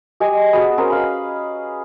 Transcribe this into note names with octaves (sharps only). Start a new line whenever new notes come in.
G4 D#5 G#5
B3 F#4 G#4
C#4 G#4 A#4 C5
B4 F5 B5